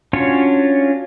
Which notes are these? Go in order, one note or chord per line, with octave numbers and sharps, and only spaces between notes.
C#4 D4 F4 F#4 C#5